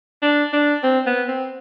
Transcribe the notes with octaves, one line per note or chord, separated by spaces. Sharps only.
D4
D4
C4
B3
C4